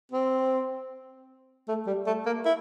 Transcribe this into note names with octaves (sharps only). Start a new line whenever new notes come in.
C4
A3
G3
A3
A#3
E4